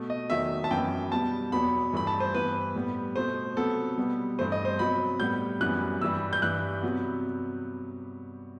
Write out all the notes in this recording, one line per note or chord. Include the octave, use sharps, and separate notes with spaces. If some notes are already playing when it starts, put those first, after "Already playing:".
Already playing: B2 A3
D#5
E2 D#3 F#3 A3 E5
A5
F#2 E3 B3 G5
B2 G3 B3 A5
E2 B2 F#3 B3 B5
G2 E3 A3 B5
A5
C5
G2 E3 B3 B4
A2 G3 B3
B2 A3 C5
C3 F#3 B3 A4
B2 G3 B3
G2 E3 A3 C5
D#5
C5
C3 F#3 B3 B5
A2 G3 B3 G6
F#2 E3 G3 B3 F#6
G2 E3 G3 E6
G6
G2 E3 G3 F#6
C3 F#3 B3